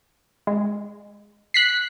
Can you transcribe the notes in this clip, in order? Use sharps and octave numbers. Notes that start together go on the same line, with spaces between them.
G#3
F#6 B6 C7